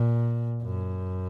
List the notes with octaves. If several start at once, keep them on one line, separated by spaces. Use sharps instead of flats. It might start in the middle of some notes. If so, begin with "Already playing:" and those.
Already playing: A#2
F#2